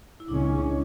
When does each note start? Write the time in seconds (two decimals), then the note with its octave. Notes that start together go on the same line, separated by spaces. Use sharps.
0.20 E4
0.28 C#2 C#3 G#3 C#4 D4